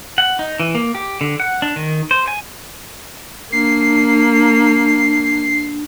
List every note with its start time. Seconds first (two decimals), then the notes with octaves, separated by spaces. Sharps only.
0.18 F#5
0.39 D#4
0.60 E3
0.75 A#3
0.95 G4
1.21 D3
1.40 F#5
1.62 D4
1.76 D#3
2.11 C5
2.28 G#5
3.52 A#3 D4 C7